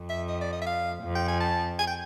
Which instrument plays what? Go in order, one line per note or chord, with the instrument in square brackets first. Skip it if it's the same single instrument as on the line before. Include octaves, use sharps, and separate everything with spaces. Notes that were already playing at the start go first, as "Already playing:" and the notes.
Already playing: [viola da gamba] F2
[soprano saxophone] E5
D#5
D5
D#5
E5
F5
[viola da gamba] F2
[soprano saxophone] G5
G#5
A5
G#5
G5